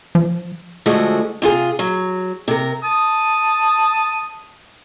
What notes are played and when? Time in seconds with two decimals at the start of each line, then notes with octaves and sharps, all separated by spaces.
0.15 F3
0.86 D3 F3 G#3 A3 F#4
1.42 C3 F4 G#4
1.79 F#3
2.48 C3 A#4
2.83 A5 D#6